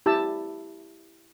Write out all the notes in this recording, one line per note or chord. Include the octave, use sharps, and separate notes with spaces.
E4 G4 A5 E6